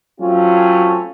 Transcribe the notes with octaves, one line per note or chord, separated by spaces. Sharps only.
F#3 A3 C4 C#4 F4